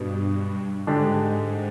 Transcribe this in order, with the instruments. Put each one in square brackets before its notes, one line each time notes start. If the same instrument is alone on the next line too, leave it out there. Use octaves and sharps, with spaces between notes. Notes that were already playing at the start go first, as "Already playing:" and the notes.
Already playing: [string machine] G2 [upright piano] B2 B3
[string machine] G#2 [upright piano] D3 G#3 D4 G4